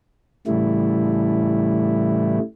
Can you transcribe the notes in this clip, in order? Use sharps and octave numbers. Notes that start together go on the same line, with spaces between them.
A2 C#3 E3 G3 A3 E4